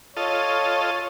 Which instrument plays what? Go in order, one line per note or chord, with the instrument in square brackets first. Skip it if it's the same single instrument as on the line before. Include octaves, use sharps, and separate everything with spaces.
[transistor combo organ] F4 A4 D#5 [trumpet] C#5